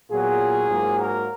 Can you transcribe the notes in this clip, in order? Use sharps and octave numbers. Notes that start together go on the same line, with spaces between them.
A#2 F#3 B3 F4 G#4
G#2 F#3 A#3
F#4 A#4